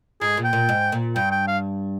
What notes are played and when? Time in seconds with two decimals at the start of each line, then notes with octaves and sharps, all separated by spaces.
0.21 G#2 G#4
0.37 A#2
0.44 G5
0.53 A#2
0.69 G#2
0.92 A#2
1.16 G2 G5
1.31 G5
1.47 F5